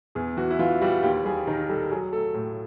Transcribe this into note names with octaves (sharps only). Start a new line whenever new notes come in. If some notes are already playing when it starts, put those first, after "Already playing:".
E2 G#4
E3 F#4
E4
E3 F4
G3 F#4
D#2 G4
G3 G#4
D#3 A#4
G3 A4
F#3 G#4
A3 A4
A2 A4